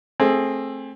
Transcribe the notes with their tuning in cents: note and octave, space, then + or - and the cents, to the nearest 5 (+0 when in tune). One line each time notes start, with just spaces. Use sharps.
A3 +0 C4 +20 G#4 +0